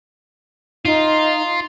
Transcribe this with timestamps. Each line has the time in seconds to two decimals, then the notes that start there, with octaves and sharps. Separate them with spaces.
0.85 D#4 F4